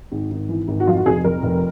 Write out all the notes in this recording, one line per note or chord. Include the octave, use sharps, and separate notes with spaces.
G#1
G#1
E3
G#1
F#4
F2 F4
F#4
F1 G#4
F2 A#4
F1